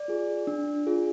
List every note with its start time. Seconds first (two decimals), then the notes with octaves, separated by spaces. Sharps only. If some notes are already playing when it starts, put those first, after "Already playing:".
Already playing: D5
0.08 F4 G#4
0.47 D4
0.87 F4 G#4